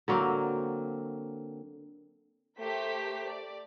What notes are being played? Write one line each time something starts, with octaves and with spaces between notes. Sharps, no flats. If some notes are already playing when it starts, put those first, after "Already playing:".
D3 F#3 A#3 C4
A3 G4 A#4 C5 B6
D5